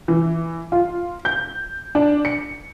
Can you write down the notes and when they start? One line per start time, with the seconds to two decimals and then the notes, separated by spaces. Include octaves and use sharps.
0.08 E3
0.72 F4
1.25 G6
1.95 D4
2.25 C#7